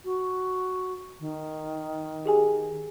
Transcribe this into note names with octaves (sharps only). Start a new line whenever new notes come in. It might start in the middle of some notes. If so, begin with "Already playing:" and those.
F#4
D#3
G4 G#4 G#5